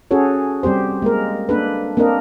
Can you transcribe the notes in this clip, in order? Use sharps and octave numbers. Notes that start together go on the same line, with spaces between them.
C#4 F#4 G#4 A4 C#5
G3 C4 G4 C5
G#3 A#3 A#4
A#3 D4 A4 B4
A#3 C4 D4 A#4 D#5